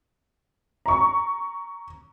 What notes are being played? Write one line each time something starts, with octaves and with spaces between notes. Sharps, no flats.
A#5 C#6